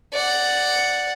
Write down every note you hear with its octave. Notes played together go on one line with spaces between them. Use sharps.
D5 F#5